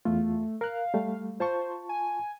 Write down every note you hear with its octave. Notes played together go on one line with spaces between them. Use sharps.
E2 A3 F4
A#4 F5 F#6
G3 A3
F4 C5 A5 C#6
G#5